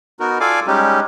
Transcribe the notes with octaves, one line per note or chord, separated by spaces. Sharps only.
B3 D#4 F#4 A#4
F4 A4 D5 F5 G#5 D6
G3 G#3 C#4 D#4 G4